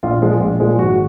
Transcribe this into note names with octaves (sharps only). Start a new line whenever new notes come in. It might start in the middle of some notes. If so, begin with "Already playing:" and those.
A#1 F4
A#2 F3 G#3
A#1
A#2 F3 G#3
G#1 F#4